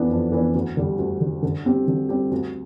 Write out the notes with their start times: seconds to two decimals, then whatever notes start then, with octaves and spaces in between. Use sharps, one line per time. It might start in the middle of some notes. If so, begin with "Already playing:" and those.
Already playing: F2 E3 B3 D4
0.11 F2
0.32 E3 B3 D4
0.54 D2
0.77 D3 G3
0.99 D2
1.21 D3 G3
1.43 D3
1.65 G3 C4 G4
1.88 D3
2.09 G3 C4 G4
2.31 D2